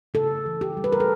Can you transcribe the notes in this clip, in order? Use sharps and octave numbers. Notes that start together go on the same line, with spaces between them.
C#3 A4
E3
G4
G3
B4
A#4
A4